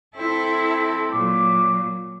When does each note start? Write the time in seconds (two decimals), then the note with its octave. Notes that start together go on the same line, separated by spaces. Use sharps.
0.16 C4 E4 A4
1.12 A#2 F#3 D6